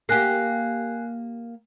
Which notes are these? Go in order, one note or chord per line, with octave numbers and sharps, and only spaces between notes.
A#3 G4 G#5 F#6 C7